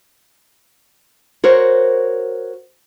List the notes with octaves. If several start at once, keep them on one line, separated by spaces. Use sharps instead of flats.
F#4 A#4 C5 C#5